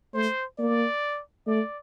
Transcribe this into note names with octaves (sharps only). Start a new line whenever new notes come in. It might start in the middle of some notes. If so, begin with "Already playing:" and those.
A3 C5
A#3 D5
A3 D5